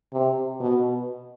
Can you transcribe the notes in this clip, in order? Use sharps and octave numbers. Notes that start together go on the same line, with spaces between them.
C3
B2